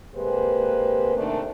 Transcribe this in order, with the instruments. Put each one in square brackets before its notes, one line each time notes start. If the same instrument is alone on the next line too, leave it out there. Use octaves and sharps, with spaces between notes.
[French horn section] C3 G#3 A#3 G4 B4 C5
C3 D#3 A3 A#3 D4